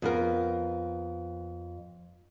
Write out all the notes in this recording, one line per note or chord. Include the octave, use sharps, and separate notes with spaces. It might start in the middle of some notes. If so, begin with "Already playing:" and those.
F2 B3 A#4